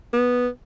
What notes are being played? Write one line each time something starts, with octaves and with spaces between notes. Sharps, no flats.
B3